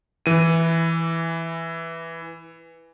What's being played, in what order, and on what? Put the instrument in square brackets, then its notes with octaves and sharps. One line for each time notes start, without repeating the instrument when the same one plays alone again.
[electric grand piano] E3 D#7